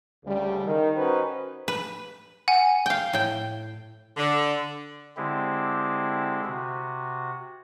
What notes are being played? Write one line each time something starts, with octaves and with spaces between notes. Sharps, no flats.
D2 C#3 G3
D#3
C#4 D#4 F#4 B4 C5
B4
F#5 G#5
F5 G5
A2 G5
D3
D3 G#3 C4 E4 G4
C3 F#4